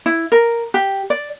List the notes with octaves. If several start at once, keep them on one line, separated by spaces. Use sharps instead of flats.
E4
A#4
G4
D5